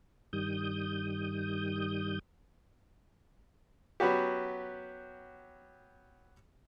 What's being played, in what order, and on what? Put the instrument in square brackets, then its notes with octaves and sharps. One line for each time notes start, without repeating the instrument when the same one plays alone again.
[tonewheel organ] G2 D#3 G3 D#6 G6
[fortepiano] F#3 B3 C#4 F#4 G4